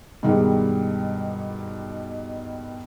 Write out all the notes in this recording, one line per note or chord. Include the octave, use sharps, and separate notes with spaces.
G2 B2 D#3 G3 G#3